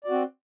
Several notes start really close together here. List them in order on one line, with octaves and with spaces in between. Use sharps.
D5 F#4 C4